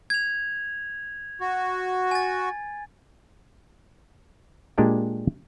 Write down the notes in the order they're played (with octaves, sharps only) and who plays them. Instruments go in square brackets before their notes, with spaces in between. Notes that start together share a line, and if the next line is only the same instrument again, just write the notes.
[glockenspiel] G#6 F7
[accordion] F#4
[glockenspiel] G#5 A6
[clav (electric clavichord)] A#2 G#3 D4 G4 D5 G5